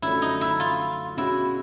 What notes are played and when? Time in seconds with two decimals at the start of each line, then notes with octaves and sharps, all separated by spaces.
0.02 F#2 D3 F3 A3 C#4 E4
0.22 D#4
0.41 E4
0.60 F4
1.17 B2 G#3 C#4 E4 F#4